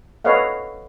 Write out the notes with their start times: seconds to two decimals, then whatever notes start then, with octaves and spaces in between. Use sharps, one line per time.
0.25 A4 B4 C#5 D#5 F5 F#5